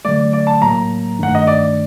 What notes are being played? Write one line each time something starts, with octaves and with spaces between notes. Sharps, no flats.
D3 F#3 A3 D5
D5
A5
A2 F#3 A#3 A#5
G2 D#3 A3 D4 F#5
D#5
D5